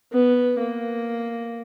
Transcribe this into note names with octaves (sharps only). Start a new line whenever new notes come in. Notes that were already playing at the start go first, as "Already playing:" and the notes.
B3
A#3